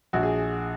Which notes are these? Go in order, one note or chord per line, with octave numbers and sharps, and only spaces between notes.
A#1 F#4
G#4